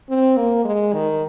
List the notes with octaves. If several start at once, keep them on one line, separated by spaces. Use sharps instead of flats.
C4
A#3
G#3
D#3